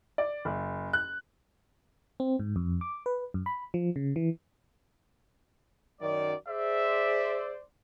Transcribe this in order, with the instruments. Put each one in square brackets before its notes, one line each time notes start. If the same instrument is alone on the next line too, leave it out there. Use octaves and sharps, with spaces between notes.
[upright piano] D5
F#1
F#6
[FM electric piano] C4
G#2
F2
D6
B4
F#2
B5
F3
C#3
E3
[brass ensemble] F#2 D#3 D5
[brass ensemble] G#4 C5 D5 [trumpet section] E5